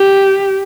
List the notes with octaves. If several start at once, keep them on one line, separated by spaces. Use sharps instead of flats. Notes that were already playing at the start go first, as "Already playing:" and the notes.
Already playing: G4